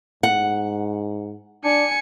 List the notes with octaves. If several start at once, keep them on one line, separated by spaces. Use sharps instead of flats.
G#2 F#5
D4 G#5 C#7